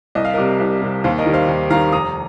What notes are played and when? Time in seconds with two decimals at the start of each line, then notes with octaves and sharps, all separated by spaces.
0.15 C2 D#5
0.24 F5
0.34 C3 G3 A#4 D#5
0.60 C2
0.82 C3 G3
1.04 D#2 C5 F5
1.19 A#4 D#5
1.26 D#3 G3
1.33 C5 F5
1.48 D#2
1.70 D#3 G3 F5 A#5
1.92 F1 A#5 D#6